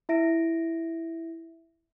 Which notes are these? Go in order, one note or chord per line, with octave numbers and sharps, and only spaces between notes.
E4 E5 A#6 D7